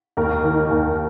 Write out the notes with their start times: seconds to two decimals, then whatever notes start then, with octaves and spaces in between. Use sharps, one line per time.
0.17 D#2 A#4
0.44 D#3
0.71 D#2